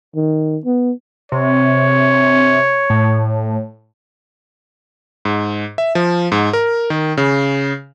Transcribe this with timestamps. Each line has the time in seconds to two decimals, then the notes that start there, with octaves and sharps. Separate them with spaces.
0.16 D#3
0.65 B3
1.32 C3 C#5
2.90 A2
5.25 G#2
5.78 E5
5.95 F3
6.32 G#2
6.53 A#4
6.90 D#3
7.17 C#3